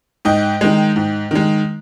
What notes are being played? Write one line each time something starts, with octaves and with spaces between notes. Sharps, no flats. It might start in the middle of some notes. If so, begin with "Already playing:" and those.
G#2 D#5 G5
D#3 G#3
G#2
D#3 G#3